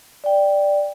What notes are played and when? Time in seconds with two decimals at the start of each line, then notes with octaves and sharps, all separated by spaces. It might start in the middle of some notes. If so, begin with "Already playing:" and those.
0.24 D5 G5